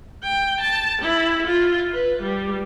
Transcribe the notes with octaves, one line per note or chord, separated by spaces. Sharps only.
G5
A5
E4
F4
B4
G3